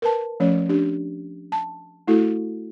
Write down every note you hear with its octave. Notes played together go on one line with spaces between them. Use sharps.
A#4 B4 A5
F3 A3 C#4 C#5
D4 G4
A5
A3 E4 F#4 A4